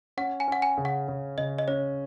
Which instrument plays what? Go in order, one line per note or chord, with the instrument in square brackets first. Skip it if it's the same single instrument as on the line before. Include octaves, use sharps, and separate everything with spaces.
[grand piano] C#4 [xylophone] F#5
[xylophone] G#5
[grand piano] C#4 [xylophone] F#5
[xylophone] G#5
[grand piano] C#3
[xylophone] F#5
[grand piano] C#3
[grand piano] C#3 [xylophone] D#5
[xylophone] D#5
[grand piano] C#4 [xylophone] C#5